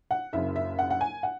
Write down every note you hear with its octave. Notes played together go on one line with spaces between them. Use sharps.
F#5
F#1 F#2 C#3 E5
E5
F#5
F#5
G#5
F#5